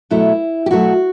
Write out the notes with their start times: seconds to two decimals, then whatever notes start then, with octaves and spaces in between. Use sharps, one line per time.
0.10 B2 F#3 A3 E4
0.66 G4
0.71 B2 F#3 A3 F#4